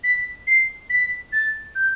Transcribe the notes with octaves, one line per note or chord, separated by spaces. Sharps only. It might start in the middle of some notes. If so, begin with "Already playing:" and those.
B6
C7
B6
A6
G6